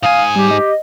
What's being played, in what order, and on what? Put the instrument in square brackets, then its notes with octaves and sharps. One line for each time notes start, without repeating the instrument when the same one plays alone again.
[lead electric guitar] G#2 G#5 [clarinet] F5 [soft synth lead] D#6
[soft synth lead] G3 [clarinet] G4
[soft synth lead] D#5